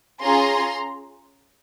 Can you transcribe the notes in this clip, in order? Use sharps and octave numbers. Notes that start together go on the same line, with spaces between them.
C#4 F4 G#4 A#5 C6